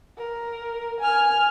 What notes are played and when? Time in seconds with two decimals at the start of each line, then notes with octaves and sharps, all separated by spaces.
0.18 A#4
1.00 G#5 F6